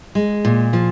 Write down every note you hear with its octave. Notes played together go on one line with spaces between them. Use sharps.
G#3
A#2
F3